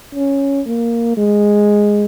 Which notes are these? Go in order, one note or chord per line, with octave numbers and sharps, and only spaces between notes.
C#4
A#3
G#3